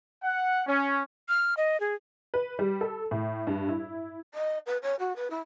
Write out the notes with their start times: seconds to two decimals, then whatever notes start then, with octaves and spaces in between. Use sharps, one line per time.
0.22 F#5
0.66 C#4
1.29 F6
1.57 D#5
1.80 G#4
2.34 B4
2.59 G3
2.81 A4
3.11 A2
3.47 G2
3.69 E4
4.34 D#5
4.66 B4
4.82 C#5
4.99 F#4
5.16 B4
5.30 E4